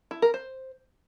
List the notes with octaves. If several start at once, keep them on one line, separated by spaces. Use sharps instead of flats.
E4
A#4
C5